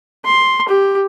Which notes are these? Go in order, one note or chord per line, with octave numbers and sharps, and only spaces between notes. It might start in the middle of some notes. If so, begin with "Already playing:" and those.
C6
G4